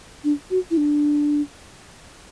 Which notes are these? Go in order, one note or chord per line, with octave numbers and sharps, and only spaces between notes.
D4
F#4
E4
D4